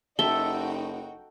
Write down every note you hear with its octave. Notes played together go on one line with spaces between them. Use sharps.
F#1 D#4 F#4 A4 E5 G5 G7